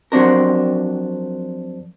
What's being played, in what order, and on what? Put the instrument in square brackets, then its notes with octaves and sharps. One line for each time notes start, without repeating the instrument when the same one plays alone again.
[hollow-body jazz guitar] F2 F#3 C4 D4 A#4